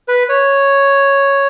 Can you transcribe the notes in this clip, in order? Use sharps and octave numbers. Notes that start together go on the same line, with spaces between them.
B4
C#5